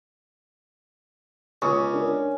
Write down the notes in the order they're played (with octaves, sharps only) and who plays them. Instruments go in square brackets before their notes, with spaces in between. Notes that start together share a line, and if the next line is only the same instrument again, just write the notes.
[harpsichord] C#2 [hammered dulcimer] C#4 [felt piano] C#6 D#6
[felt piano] D4 A#4